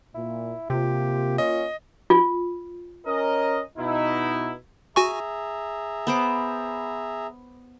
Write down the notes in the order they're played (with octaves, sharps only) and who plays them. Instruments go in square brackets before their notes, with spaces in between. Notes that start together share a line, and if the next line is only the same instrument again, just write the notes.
[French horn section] A#2 [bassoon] E4
[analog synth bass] C3 [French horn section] A#3 F4 [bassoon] G4
[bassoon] C#4 [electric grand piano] D#5
[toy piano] F4
[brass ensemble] C#4 A#4 D#5
B2 D#4 E4
[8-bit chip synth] F#4 G#5 C#6 [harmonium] G#4 E5 A#5
[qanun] B3 C5 D6